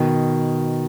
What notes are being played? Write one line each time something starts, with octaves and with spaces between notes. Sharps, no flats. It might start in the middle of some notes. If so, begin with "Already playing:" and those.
Already playing: B2 D#3